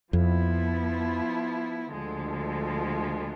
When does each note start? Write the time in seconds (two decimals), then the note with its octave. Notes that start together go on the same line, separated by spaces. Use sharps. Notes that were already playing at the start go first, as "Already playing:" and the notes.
0.13 F2 F3 B3 E4
1.92 D2 D3 F3 G#3